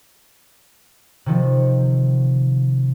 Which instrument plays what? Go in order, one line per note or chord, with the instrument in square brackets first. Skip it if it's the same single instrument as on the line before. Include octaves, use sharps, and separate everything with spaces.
[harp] C3 D#3 F3